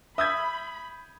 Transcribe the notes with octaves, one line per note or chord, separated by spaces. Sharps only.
E5 B5 D#6 G6 G#6